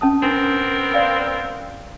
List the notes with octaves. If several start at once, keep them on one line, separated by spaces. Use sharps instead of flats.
C#4 A5 D#6
B3 C4 D4 A#4
D5 F5 C6